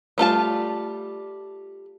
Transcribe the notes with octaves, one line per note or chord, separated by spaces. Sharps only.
G3 A3 F4 A5